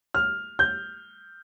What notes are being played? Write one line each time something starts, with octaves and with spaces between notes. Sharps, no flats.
F6
G6